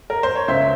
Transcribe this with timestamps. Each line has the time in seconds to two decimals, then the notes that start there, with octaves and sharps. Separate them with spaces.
0.10 A#4
0.23 C5
0.35 C#5
0.48 C#2 C5 E5